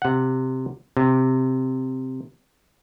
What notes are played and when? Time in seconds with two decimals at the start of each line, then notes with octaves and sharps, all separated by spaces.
0.02 C3 F#5
0.97 C3